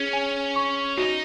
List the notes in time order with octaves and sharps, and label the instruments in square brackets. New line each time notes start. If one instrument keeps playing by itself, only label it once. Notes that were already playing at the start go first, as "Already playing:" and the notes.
Already playing: [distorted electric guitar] C#4 [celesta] G#4
[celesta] G#5
C#6
[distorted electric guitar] D#4 [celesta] F#4